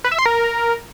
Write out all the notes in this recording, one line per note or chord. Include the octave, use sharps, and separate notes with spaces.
B4
E5
C6
A#4